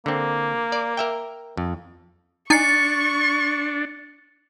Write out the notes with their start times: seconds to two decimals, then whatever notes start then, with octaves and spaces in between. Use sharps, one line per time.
0.06 D3 A#3 C4
0.72 D5
0.97 A#4 E5 G5
1.57 F2
2.50 D4 D#4 G#5 C#6 A6 C7 C#7